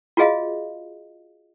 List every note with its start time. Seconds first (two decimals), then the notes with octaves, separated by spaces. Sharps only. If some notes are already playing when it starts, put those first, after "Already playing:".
0.17 F4 F#4 G#4 D#5 F5